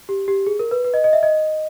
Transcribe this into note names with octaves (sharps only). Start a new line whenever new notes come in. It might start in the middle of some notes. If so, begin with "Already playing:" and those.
G4
G4
G#4
A#4
B4
B4
D#5
D#5
E5
D#5